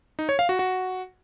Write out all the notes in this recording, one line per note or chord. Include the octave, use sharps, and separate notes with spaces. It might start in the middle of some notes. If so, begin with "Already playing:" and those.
D#4
C#5
F5
F#4
F#4